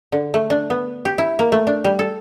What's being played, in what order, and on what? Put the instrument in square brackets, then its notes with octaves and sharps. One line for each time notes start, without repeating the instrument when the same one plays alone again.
[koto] D3
A3
D4
B3
G4
E4
A#3
A3
D4
G3
A4